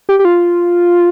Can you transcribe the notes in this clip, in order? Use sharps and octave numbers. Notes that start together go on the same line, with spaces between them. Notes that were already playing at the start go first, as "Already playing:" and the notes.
G4
G4
F4